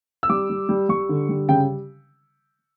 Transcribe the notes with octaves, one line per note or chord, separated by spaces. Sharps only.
E6
G3 D6
G3
G3
G3 C#6
D3
G3
C#3 G5